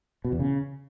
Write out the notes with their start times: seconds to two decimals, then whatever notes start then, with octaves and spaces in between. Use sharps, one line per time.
0.25 B2
0.32 E2
0.39 C#3